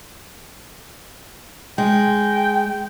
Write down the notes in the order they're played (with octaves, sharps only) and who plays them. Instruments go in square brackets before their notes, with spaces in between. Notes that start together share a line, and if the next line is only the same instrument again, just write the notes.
[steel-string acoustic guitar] G#3 [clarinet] G5